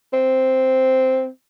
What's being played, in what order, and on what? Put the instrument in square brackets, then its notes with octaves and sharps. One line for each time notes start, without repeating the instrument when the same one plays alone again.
[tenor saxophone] C4